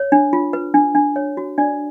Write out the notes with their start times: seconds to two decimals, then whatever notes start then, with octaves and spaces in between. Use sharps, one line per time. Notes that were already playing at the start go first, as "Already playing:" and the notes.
Already playing: C#5
0.12 D4
0.33 F4
0.53 B4
0.74 D4
0.95 D4
1.16 C#5
1.37 F#4
1.58 D4 D5